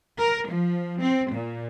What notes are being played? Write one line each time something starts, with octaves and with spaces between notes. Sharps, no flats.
A#4
F3
C4
A#2